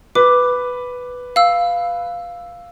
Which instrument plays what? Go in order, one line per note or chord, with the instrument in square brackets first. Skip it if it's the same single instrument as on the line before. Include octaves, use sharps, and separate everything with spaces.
[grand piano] B4 [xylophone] D6
[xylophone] F5 E6